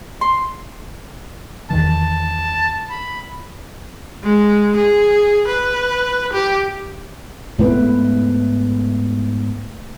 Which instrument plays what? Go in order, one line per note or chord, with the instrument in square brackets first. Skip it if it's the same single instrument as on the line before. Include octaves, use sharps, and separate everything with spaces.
[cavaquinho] C6
[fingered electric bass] E2 D#3 E3 [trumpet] A5
[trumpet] B5
[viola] G#3
G#4
B4
G4
[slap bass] G#2 B3 C4 [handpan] A3 E4 B4